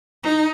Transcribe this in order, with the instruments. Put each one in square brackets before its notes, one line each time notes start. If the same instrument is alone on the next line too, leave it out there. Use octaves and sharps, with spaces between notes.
[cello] D#4